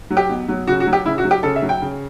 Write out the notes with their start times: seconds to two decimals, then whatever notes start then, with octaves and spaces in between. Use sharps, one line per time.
0.10 F#3
0.17 G4
0.29 B2
0.48 F#3
0.67 C#3 F#4
0.80 F#4
0.87 F#3
0.93 G4
1.05 C#3 E4
1.18 F#4
1.24 F#3
1.31 G4
1.43 C#3 A4
1.56 E5
1.62 F#3
1.69 G5
1.81 C#3